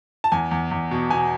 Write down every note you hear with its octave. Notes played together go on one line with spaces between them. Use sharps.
A5
E2 G#5
E2
E2
B2
B2 G#5